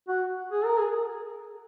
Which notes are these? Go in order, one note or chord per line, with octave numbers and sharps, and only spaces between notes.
F#4
G#4
A#4
G#4